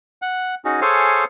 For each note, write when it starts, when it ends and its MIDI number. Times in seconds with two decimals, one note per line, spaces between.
0.22 0.55 78
0.65 0.81 61
0.65 0.81 63
0.65 0.81 66
0.65 0.81 68
0.81 1.25 68
0.81 1.25 69
0.81 1.25 72
0.81 1.25 73
0.81 1.25 77
0.81 1.25 80